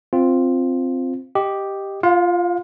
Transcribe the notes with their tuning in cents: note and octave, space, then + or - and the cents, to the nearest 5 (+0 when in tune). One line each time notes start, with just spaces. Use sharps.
C4 +0 F4 +0
G4 +0 D#5 +0
F4 -10 F5 +35